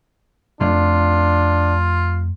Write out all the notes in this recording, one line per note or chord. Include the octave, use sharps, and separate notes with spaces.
F2 A3 D4 F4